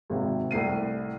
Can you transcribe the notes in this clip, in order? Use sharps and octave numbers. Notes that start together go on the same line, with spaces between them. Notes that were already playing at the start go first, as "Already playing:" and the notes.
G#1 C3
C2 A2 C7 D#7